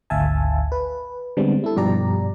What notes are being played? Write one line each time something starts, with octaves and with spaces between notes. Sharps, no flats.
G#1 D2 E5 F5 G#5 A5
B4
D3 G3 G#3 B3 C4 D4
E4 A4
G2 B2 F3 G4 D5 A#5